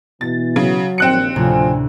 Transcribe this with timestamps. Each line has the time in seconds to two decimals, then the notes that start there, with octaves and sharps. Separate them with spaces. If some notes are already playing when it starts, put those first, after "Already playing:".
0.21 B2 E3 A6
0.56 C#3 F#3
0.98 A#1 D#2 C4 F#6 C#7
1.36 D2 A2 C3 F3 A3 G#5